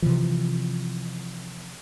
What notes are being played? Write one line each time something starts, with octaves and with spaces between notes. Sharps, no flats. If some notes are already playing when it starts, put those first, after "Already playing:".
C3 E3 F3